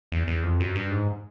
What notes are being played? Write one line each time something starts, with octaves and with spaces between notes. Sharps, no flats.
E2
E2
F2
F#2
G2
G#2